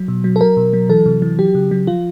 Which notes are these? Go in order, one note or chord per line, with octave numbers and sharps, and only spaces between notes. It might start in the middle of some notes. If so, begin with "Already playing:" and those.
Already playing: F#3
B2
F#3
A4
F#3 A#4
B2
F#3
E3 A4
C3
E3
F#3 G4
C#3
F#3
F3 F4